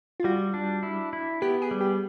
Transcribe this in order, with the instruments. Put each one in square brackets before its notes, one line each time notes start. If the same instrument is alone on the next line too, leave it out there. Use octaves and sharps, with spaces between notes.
[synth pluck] F4
[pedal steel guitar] G3 [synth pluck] F#4
[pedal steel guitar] D4
E4
E4
[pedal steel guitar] B3 [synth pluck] G4
[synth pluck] G#4
[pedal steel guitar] G3
[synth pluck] G4